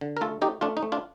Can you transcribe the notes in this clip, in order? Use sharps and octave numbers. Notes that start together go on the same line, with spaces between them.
D3
A#4
A3 F4 A4
A3 D#4 G4
A3 D4 F4
D#4
A3
D4 F4